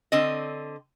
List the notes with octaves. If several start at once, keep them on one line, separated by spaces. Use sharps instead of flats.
D3 C4 D#5